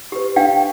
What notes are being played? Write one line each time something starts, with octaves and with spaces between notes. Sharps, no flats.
G4 B4
D4 F5 G5